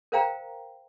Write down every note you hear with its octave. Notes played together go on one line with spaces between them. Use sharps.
A#4 C5 F5 G5 A#5